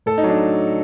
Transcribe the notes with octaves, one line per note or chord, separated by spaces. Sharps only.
A2 A4
D#4
F#3
D4